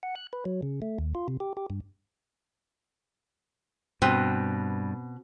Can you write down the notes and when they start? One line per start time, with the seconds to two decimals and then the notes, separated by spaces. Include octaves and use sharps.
0.03 F#5
0.15 F#6
0.33 B4
0.45 F#3
0.62 C#3
0.82 A3
0.98 D#2
1.15 F4
1.28 C3
1.40 G4
1.57 G4
1.70 G2
4.02 G2 B2 C4